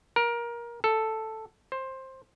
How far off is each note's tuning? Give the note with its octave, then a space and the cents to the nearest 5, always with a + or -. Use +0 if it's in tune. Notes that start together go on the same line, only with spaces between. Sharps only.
A#4 +20
A4 +0
C5 +15